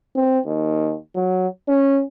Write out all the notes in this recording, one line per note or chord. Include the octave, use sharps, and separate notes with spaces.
C4
D#2
F#3
C#4